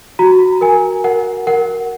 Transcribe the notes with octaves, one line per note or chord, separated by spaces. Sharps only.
F#4 A#5
A#4 G#5
A#4 F#5
A#4 F#5